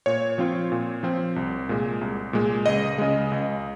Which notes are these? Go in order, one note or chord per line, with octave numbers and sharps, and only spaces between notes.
A#2 C#5
F3 C4 F4
A#2
F3 C4 F4
C2
A#2 G#3
C2
A#2 G#3
C#2 D#5
C#3 G#3
C#2